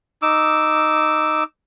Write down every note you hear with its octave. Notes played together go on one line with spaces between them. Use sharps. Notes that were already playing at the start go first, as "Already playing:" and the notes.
D#4 D6 E6